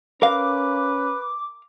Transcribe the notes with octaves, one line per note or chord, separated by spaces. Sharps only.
C#4 A#4 B4 F5 D6